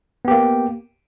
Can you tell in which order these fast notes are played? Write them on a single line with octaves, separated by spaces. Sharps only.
B3 G4 A#3